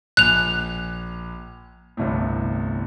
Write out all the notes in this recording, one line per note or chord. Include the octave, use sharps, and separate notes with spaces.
A#1 G#5 F#6 F7
G1 C2 A2